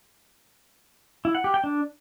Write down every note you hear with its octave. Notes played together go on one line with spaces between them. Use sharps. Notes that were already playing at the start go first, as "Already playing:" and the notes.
E4
F#5
G4
G5
D4